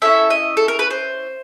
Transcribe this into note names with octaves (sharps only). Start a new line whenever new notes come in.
C#4 E4 A4 E5
D#5
A4
A#4
B4
C5